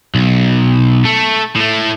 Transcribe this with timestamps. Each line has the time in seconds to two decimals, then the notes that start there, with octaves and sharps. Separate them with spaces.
0.15 B1
1.05 A3
1.56 A2 A3